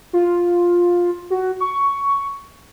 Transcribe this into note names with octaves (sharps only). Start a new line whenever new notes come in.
F4
F#4
C#6